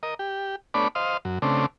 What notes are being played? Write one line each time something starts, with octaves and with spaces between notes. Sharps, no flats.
A#4 D#5
G4
A3 B3 D4 C#5 D5 B5
C5 D#5 F5
F#2
C#3 A3 C4 D4